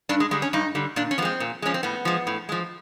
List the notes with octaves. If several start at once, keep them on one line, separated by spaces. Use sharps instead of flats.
G2 D4
G#3
D3 G3 G#3
C#4
G2 D#4
D3 G3
A#2 D4
C#4
F3 G#3 B3 C4
A#2
F3 G#3 C#4
C4
A2 B3
F3 G#3
A2
F3 G#3